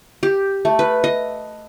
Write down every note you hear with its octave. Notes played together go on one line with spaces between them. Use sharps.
G4
A3
B4
D#5